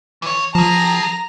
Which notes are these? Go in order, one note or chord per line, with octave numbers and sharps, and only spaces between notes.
E3 C#5
F3 G#4 A5 A#5